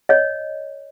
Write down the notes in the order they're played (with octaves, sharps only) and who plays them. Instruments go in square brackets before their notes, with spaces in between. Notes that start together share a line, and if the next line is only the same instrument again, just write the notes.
[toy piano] C#5 D#5